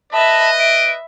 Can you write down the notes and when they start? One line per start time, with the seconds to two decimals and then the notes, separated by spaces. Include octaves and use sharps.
0.13 B4 D#5 E5 A5 B5
0.59 E5 D7